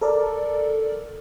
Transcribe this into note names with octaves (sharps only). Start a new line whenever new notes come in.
A4 A#4 D5